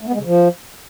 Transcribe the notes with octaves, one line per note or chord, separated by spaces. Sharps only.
A3
B3
G#3
C#3
F3